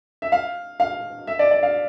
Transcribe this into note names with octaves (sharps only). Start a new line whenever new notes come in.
E5
F5
F5
E5
D5
D5
F5